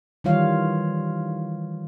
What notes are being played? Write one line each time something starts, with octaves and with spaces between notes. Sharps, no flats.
D#3 E3 G3 F4 C#5 F5